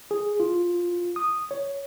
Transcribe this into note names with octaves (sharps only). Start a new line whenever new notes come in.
G#4
F4
D#6
C#5